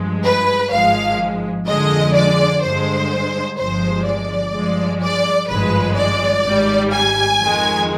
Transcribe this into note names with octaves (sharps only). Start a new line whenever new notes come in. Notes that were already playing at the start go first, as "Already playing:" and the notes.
Already playing: G2 F3 G#3
B4
G#1 G#2 F3 G#3 F5
F2 D3 F3 G#3 D#5
D5
G2 D3 G#3 C5
G1 G2 F3 G#3 C5
D5
G2 F3 G#3
D5
G#1 G2 F3 G#3 B4
D5
G#1 G#2 G3
G#5
F2 D#3 G#3